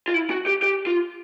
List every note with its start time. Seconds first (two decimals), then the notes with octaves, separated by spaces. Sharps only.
0.08 F4
0.14 E4
0.30 F#4
0.47 G4
0.63 G4
0.87 F4